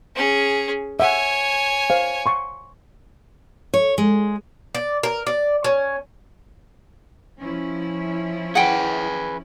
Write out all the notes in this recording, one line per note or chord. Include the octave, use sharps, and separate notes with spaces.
C#4 G#4
C#5 E5 F#5 G#5
C5 F5
C6 C#6
C#5
G#3
D5
A#4
D5
C#4
F3 C#4 E4
G#4 B4 F#5 G5